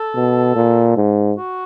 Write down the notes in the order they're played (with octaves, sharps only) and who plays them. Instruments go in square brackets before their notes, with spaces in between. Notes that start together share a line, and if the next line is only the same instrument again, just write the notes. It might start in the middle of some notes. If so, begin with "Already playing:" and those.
Already playing: [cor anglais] A4
[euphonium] B2
A#2
G#2
[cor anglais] F#4